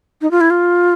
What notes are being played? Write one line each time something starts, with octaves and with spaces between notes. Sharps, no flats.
D#4
F4
E4
F4